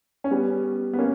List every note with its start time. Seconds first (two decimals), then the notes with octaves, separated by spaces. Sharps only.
0.24 C#4
0.31 G3 B3
0.93 B3
0.98 A#3 C#4